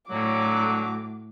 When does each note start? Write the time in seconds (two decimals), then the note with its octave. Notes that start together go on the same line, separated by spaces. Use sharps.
0.11 D2 A2 D3 F#3 D6